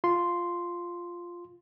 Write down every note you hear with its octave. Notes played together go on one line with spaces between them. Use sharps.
F4 C6